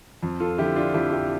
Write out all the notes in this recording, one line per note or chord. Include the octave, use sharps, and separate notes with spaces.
F2
F4 A4
D3 F3 E4 G4
D4 F4
F2 E4 G4
E4 G4